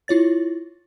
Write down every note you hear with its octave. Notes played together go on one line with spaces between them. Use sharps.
E4 F4 C#5 A6